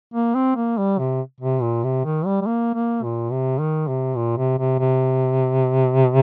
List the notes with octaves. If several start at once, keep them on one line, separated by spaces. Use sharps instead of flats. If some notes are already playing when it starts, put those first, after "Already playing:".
A#3
C4
A#3
G3
C3
C3
A#2
C3
D#3
G3
G3
A#3
A#3
A#2
C3
D#3
C3
A#2
C3
C3
C3